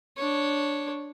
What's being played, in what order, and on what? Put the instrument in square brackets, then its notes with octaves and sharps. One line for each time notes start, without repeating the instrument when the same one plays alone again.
[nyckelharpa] D4 C#5